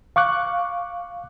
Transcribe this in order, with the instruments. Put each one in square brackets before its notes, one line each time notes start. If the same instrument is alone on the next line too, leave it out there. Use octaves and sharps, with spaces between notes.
[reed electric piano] F5 C#6 D6 F#6